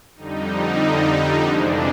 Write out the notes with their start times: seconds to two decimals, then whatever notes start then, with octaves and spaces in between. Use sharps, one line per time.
0.16 F2 D3 G3 D#4
1.46 F2 C3 E3 G#3 D4